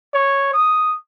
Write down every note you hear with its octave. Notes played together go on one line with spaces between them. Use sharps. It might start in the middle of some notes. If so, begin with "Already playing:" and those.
C#5
D#6